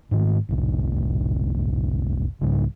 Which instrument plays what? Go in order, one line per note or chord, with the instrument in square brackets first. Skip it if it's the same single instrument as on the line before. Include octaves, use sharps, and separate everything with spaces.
[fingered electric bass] G#2 D#3 A3
F#1 C2 A2
C2 G#2 C#3 G3